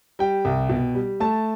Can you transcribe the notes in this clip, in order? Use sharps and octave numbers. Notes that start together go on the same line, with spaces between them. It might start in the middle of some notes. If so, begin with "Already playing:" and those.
G3 G5
C2
B2
G3
A3 A5